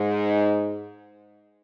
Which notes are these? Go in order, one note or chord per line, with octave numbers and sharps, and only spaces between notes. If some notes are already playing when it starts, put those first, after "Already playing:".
Already playing: G#2